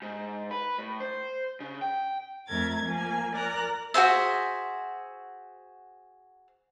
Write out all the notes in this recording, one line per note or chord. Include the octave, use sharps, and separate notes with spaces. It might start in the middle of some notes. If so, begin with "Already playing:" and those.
G#2
B4
A2
C5
C#3
G5
F2 A3 A#4 G#6 A6
F3 A#3 G#5
A#4 D5 A#5 F#6
F#4 G#4 C5 E5